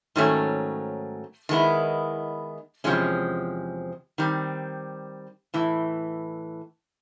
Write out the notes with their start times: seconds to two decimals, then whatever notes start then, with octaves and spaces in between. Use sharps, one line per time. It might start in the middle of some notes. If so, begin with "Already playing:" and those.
0.16 G#2 D#3 F#3 A3 C#4
1.49 D#3 G#3 B3 E4
2.84 E2 C3 F3 G#3 C#4
4.18 D#3 G3 C4
5.54 A2 E3